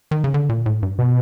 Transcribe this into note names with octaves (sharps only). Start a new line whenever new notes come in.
D#3
C#3
D3
A#2
A2
G2
B2